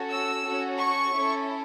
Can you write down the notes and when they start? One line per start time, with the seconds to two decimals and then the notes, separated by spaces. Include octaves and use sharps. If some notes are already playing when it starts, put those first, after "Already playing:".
Already playing: C#4 F#4 A4
0.10 E6
0.45 C#4 F#4 A4
0.78 C#6
1.13 C#4 E4 A4